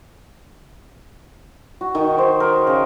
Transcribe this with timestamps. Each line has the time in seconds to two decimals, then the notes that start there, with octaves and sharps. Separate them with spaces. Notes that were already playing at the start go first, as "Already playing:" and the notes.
1.81 F#4
1.95 D#3
2.18 C5
2.40 A#4
2.67 C#3